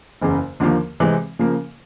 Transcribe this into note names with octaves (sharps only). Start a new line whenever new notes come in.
F#1 E2 C#3
D#2 D3 F3 A#3
C3 E3 G#3 C4
C#3 F3 A#3